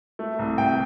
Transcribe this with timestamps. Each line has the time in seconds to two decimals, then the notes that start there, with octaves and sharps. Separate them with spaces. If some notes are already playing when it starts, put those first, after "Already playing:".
0.19 A3
0.39 C2
0.58 C2 G5